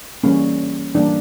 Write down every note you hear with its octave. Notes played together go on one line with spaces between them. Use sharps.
E3 G3 A#3 C#4
E3 G3 A#3 D4